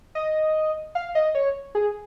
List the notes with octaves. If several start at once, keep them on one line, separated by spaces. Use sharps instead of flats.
D#5
F5
D#5
C#5
G#4